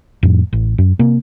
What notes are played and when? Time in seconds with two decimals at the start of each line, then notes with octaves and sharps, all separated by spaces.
0.23 F2 A2
0.53 A1
0.78 F#2
0.99 C3 A#3